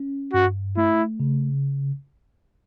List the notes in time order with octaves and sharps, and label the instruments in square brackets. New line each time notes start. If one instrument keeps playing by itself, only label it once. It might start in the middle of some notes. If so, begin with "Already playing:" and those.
Already playing: [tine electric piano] C#4
[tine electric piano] G2 [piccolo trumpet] F#4
[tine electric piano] A3 [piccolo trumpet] E4
[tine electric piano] C#3